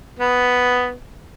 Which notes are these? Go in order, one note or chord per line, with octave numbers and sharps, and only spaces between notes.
B3